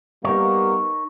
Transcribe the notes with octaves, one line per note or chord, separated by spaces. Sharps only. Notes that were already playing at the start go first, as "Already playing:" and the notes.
G3 A#3 B3 D#4 A#4 C#5